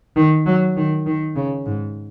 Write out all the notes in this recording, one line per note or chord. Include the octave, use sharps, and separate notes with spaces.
D#3
F#3
D#3
D#3
C#3
G#2